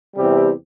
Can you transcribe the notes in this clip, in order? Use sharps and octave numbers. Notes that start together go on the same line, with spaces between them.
E2 C3 G3 C4 G4